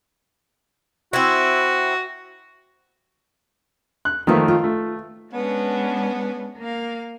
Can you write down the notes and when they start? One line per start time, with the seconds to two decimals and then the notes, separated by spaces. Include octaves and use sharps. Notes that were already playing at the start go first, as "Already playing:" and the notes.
1.13 C4 E4 F#4
4.05 F#6
4.27 D#3 F3 A3 A#3 B4
4.48 F4
4.64 A3
5.32 G#3 B3 C#4 D4
6.58 A#3 F5